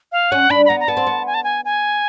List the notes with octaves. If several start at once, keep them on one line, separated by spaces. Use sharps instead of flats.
F5
C#4 F#5
D4 B5
B5
B3 A#5
A#5
B3 A5
C4
B3
G#5
A5
G#5
G#5